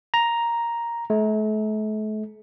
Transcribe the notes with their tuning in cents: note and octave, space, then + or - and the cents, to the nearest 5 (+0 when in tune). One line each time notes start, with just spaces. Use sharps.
A#5 +5
A3 -40